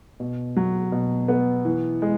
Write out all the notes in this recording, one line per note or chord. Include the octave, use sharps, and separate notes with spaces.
B2
F#3
B2
B3
E3
G#3